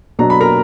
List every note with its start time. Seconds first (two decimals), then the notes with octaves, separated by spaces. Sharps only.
0.19 B2 F#3 D4 A#5
0.30 B5
0.41 A#4 A#5